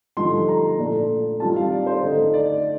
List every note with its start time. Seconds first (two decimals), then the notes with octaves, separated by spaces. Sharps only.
0.17 G2 D3 F3 A3 D#4 C6
0.49 A#5
0.78 A#2 A3 D4
1.40 G2 D#3 G3 C4 F4 A5
1.56 F5
1.71 D5
1.86 C5
2.03 D3 A3 D#4
2.34 D5